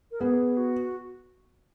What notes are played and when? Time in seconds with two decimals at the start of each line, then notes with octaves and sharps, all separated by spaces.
0.11 A#4
0.20 B3 G#4
0.57 F#4